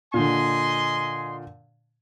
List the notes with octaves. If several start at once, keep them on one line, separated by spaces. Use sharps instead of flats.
A#2 D3 D#5 G#5 C6